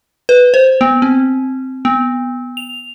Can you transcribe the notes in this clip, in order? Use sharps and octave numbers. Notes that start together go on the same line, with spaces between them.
B4
C5
B3
C4
B3
F7